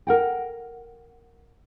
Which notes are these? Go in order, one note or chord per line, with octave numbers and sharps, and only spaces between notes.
A#4 F#5 G5